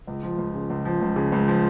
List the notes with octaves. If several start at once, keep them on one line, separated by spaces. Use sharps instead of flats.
C#2
F3
C#2
C#3
C#2
F3
C#2
C#3
C#2
F3